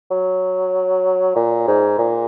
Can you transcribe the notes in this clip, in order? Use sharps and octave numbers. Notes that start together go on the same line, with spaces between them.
F#3
A#2
G#2
A#2